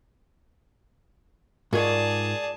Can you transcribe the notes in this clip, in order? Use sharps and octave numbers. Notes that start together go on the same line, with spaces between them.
G#2 F4 G#4 A#4 C#5 D5 A5